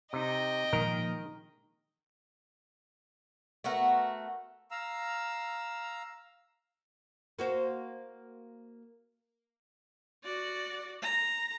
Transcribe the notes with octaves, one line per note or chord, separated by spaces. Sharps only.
C3 D#4 D#5 G5
A#2 D#3 F3 G#3 A#4
A3 B3 F#4 A#4
F5 A#5 E6
A#3 F#4 C5
F#4 D5
A#5